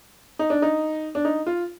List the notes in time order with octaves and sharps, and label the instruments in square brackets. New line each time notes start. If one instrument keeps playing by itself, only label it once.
[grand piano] D#4
D4
D#4
D4
D#4
F4